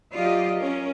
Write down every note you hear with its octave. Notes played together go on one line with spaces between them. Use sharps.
F#3 F4 G4 D5 D#5
C#4 A#4